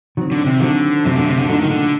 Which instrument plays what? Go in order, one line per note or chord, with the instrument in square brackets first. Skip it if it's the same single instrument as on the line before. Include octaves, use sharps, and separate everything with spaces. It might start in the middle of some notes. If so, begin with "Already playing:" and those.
[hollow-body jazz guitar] D#3 F#3 C4
[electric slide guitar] D3
C3
[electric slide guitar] D3 [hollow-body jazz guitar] D#3 F#3 C4
[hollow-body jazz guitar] F#2 F#3 A3 [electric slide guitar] C3
[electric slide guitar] D3
C3
D3
[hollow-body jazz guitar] A#2 F#3 A3 D#4 [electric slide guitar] D3
[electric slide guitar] D#3
D3